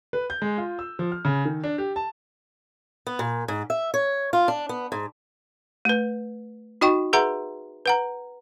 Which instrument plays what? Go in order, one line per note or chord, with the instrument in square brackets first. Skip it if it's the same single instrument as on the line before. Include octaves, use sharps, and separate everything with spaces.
[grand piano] B4
G6
G#3
F4
E6
F3
F6
C#3
D#3
D4
G4
A5
[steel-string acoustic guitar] B3
A#2
G#2
E5
C#5
F4
D4
B3
G#2
[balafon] A3 B4
D#4 F#4 D#5 G5 C#6
G#4 B4 E5 F#5 A#5 C6
B4 F#5 A#5